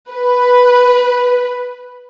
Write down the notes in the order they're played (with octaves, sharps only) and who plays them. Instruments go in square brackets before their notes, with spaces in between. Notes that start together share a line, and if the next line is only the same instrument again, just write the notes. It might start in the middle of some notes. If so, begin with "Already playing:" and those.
[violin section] B4